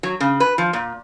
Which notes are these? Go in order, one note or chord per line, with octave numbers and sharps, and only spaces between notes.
F#3
C#3
B4
F3
A#2